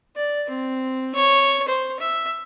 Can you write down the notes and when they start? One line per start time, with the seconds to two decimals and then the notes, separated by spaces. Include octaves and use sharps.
0.16 D5
0.49 C4
1.15 C#5
1.68 C5
1.99 E5